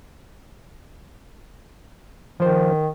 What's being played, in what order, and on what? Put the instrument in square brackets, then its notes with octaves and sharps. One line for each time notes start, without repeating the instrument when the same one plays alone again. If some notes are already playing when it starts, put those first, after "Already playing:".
[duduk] D#3 [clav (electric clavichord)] F3 C5